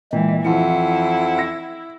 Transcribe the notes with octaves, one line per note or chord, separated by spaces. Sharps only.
A#2 E3 G#3 G5
F2 E3 F3 E4 F#5
E6 A#6